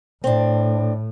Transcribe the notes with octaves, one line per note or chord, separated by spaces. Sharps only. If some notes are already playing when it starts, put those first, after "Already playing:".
A2 C4 D4